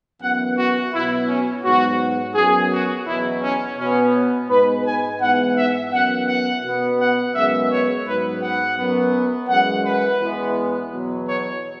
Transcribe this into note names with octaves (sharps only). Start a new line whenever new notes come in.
F#2 E3 B3 F#5
F#4
B2 F#3 B3 E4
C#4
G#2 F#3 B3 F#4
F#2 F#3 B3 G#4
F#4
E2 B2 F#3 E4
C#4
B2 B3 C#4
G#2 G#3 B3 B4
G#5
G#2 E3 B3 F#5
E5
F#2 E3 B3 F#5
F#5
B2 B3
F#5
F#2 C#3 G#3 B3 E5
C#5
G#2 F#3 B3 B4
F#5
F#2 F#3 B3
F#2 E3 G#3 F#5
B4
E2 E3 G#3 B3
E2 B2 F#3
C#5